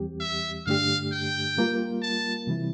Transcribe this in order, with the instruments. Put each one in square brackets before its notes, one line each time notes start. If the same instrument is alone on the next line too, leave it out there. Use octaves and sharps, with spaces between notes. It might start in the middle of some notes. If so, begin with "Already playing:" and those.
Already playing: [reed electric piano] E2 E3 G3 C4 G4
[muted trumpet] E5
[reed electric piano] G2 D3 A3 D4 G4 [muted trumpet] F5
[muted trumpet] G5
[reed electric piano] G3 A#3 F4 A#4
[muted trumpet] A5
[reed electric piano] C3 E3 G3 C4 E4